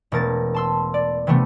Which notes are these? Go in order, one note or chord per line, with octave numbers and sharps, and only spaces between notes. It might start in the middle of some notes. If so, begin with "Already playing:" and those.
E1 A3 A#4 A6
A5 C6 E6
D5
C3 E3 G3 A3 B3